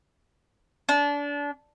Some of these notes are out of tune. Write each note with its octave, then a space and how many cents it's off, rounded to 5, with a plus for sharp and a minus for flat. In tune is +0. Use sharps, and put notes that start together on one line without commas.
D4 -30